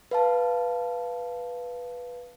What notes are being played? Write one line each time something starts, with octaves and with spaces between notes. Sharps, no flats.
B4 F5 A5